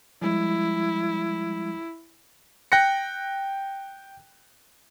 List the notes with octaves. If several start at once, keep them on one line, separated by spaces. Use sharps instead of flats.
F3 G3 G#3 E4
G5 F#6 A#6 C#7